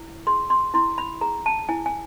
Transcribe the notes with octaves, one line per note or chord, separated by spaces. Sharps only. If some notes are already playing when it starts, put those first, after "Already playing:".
Already playing: E4
G#4 C6
C6
E4 C6
B5
G#4 A#5
A5
E4 G#5
G#5